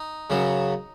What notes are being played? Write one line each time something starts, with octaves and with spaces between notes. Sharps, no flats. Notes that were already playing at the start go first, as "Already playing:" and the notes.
Already playing: D#4
F#2 C#3 F#3